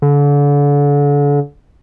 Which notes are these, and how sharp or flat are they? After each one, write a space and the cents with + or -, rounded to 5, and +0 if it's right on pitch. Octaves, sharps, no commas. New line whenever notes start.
D3 -35